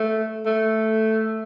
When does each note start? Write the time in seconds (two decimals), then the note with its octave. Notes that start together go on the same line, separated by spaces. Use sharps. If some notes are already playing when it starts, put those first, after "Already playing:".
Already playing: A3
0.46 A3